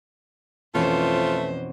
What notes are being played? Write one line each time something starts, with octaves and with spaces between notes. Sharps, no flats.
F2 B2 E3 A3 C#4 F4 C5